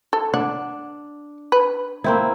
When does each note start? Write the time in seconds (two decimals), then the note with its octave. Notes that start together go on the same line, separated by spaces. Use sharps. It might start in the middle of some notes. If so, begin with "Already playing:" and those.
0.13 A4
0.34 D4 F#5
1.52 B4
2.04 A#3 C4 E4